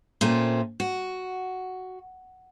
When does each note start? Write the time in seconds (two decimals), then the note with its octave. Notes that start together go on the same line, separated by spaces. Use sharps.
0.21 A#2 A3 C4 C#4
0.80 F#4